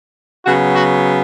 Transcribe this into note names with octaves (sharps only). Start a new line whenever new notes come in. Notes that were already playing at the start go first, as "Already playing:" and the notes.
C#3 F#3 B3 F#4
F#4